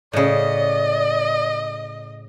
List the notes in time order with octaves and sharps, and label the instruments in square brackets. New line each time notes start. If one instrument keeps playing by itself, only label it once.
[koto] A2 C#3 [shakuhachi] D5 [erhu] D#5